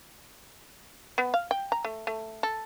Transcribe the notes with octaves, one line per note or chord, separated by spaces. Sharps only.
B3
F5
G5
A#5
A3
A3
A4